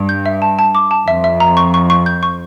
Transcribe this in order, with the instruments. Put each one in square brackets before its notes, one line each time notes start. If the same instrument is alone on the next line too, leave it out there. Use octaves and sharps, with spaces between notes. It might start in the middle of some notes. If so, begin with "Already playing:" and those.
Already playing: [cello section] G2
[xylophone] G6
E5
A5
A5
D6
A5
[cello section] F2 [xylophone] E5
[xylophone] E5
A#5
C#6
C#6
C#6
G6
C#6